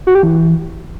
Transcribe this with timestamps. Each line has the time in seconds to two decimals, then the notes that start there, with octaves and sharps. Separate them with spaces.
0.07 F#4
0.15 G4
0.23 E3